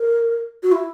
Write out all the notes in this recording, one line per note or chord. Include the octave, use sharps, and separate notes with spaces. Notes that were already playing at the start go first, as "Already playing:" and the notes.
Already playing: A#4
F#4
E4